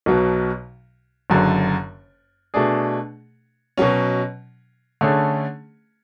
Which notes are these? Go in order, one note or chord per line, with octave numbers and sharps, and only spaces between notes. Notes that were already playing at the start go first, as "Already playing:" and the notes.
B1 B2 F#3
F#1 F#2 D3
B2 A3 D4 G#4
B2 F#3 C#4
D3 A3 C#4 G#4